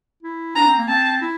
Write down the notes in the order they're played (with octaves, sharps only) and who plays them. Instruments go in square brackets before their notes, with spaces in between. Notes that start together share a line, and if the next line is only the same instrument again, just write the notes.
[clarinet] E4
[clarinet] D4 [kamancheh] A#5
[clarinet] C4
A#3
[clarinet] C4 [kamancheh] A5
[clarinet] E4